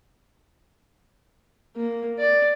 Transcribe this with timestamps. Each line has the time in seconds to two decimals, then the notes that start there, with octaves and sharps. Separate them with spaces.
1.76 A#3
2.18 D5